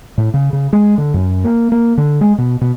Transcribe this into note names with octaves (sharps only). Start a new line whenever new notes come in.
A2
C#3
C#3
G#3
D3
F#2
A#3
A#3
D3
G#3
B2
B2